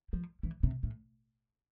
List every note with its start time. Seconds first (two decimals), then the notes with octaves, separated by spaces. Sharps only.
0.13 F3
0.43 E3
0.63 C3
0.83 A2